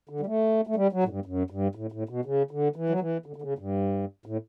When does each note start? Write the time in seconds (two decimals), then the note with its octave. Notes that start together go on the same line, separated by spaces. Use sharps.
0.09 D3
0.21 G3
0.26 A3
0.67 A3
0.76 G3
0.92 F#3
1.04 A2
1.08 G2
1.26 F#2
1.50 G2
1.75 A2
1.92 A2
2.09 B2
2.25 C#3
2.51 D3
2.76 E3
2.89 F#3
3.00 E3
3.26 D3
3.36 D3
3.42 C#3
3.59 G2
4.26 A2